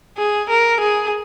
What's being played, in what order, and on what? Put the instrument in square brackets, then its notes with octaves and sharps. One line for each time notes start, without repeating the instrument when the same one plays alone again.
[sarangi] G#4
A#4
G#4